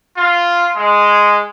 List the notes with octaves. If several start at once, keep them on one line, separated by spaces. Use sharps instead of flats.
F4
G#3